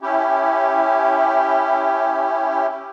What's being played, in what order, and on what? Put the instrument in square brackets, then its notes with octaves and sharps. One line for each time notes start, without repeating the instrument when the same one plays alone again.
[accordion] C#4 E4 G4